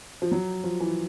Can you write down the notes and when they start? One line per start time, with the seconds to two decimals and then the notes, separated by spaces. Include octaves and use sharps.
0.22 F3
0.32 F#3
0.64 F3
0.80 E3